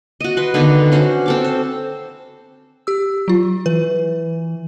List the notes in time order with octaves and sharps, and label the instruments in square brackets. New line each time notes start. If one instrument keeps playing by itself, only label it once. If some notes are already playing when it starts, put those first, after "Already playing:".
[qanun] F#4 D#5
B4 C6
D3 D#3 B3
C#4 F#4 C5
C4 A4 D6
C5
[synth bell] G4 E6
F#3 F4
[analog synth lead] E3 [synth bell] B4